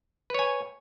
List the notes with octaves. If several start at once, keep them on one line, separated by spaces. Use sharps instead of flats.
B4 C#5 G#5